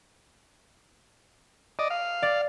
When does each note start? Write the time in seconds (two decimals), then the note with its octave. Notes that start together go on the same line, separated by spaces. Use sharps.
1.79 D5 D#5
1.90 F5
2.22 D5